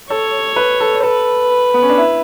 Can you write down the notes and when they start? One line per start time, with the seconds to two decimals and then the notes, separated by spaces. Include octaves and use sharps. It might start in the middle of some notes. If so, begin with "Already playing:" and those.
0.10 A4 C#5
0.56 B4
0.81 A4
1.03 A4 B4
1.74 B3
1.83 C#4
1.90 D4
1.98 E4